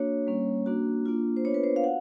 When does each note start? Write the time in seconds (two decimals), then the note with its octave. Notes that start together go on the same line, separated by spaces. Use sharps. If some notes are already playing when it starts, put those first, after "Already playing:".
Already playing: A#3 D4 F#4 C#5
0.27 G3 A#3 C#4
0.66 A#3 D4 F#4
1.06 A#3 D4 F4
1.36 C5
1.44 B3 D4 F4 C#5
1.54 B4
1.64 C5
1.76 F5
1.84 F#4 F#5